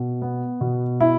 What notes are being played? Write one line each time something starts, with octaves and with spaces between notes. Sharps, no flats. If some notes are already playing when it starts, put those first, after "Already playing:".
Already playing: B2
B3
B2
E4